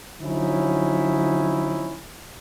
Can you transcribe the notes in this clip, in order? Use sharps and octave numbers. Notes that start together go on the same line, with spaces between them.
D3 F3 F#3 C#4 D#4 E4